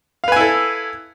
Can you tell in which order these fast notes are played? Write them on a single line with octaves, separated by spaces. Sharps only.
F5 B4 G#5 E4 A4